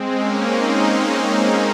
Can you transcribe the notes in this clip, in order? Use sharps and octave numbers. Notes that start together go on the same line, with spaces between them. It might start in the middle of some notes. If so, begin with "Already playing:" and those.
Already playing: G#3 C4
A#3 C#4
C4 D#4